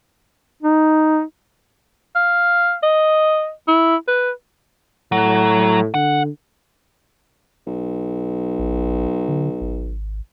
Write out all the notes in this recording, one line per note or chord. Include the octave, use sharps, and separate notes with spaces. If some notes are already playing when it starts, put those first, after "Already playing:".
D#4
F5
D#5
E4
B4
A2 F#3
D3 F#5
B1
A1
D3
G#1